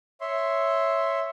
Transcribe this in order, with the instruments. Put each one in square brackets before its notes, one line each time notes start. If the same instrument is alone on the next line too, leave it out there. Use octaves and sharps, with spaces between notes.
[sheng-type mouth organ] C#5 E5 C6